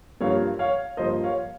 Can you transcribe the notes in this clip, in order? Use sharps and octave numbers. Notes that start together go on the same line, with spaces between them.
G2 F3 A#3 C#5 F5
C#5 F5
G2 F3 A#3 C5 D#5
C#5 F5